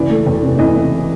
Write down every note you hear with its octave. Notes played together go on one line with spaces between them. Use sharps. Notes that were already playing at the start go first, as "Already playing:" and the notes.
Already playing: C#3 E3 D5
A3
E2
C3
E3 D#5
A3